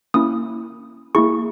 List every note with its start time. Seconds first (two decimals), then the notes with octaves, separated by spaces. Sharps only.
0.14 A#3 C#4 E4 D#6
1.15 A#3 E4 G#4 C#6